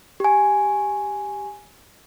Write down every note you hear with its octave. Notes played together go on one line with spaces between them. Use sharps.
G4 G#5